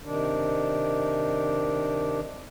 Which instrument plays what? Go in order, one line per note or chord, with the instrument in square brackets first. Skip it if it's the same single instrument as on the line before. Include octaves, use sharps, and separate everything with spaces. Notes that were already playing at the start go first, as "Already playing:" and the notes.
[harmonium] C3 D#3 D4